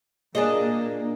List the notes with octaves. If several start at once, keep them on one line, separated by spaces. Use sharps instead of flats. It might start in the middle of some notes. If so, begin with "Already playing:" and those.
A#2 A#3 D4 G#4 D#5